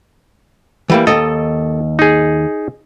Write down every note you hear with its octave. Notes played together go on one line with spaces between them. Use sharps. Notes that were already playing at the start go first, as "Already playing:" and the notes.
E3 G3 A#3
D#2 A4 D#5
D#4 G#4